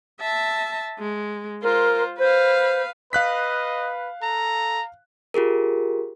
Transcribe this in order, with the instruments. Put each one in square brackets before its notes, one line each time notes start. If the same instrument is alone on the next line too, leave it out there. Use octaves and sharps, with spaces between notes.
[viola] E5 A5
G#3
[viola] F4 C5 [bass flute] A#4
[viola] B4 F5 [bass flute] C5
[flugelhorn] B4 [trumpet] D#5 [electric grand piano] F5 F#6 B6
[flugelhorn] A4 [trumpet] A#5
[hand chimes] F4 G4 G#4 A#4